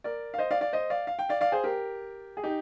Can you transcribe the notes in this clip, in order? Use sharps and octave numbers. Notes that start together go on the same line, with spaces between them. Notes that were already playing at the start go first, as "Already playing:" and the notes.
A#4 D5
F5
C5 D#5
D5 F5
D5 F5
C5 D#5
D5 F5
F5
G5
D5 F5
D5 F5
G#4 C5
G4 A#4
G#4
D#4 G4